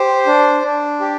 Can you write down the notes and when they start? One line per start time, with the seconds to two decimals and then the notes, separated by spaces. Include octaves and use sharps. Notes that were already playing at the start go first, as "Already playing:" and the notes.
Already playing: G4 C5
0.26 D4
0.62 D4
1.00 G4